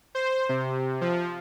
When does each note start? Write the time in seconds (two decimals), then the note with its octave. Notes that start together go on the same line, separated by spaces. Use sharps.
0.15 C5
0.49 C3
1.01 F3